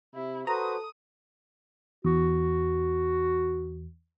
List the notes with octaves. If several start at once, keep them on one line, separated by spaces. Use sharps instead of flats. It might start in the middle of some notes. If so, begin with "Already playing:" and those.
C3 E4
F#4 A4 B4 C5 A#5 D#6
E2 F#4